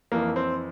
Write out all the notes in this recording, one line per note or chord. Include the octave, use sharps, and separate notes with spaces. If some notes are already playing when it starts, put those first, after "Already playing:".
F2 E3 A#3
C4